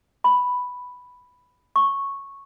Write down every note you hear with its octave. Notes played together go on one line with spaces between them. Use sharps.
B5
C#6